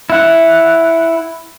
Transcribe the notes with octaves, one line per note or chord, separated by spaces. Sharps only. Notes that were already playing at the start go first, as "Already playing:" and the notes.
E4 F#5